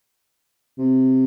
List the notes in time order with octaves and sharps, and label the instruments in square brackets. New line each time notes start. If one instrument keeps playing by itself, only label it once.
[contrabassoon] C3